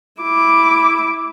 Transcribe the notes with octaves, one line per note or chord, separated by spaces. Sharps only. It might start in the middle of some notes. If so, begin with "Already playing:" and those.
E4 D6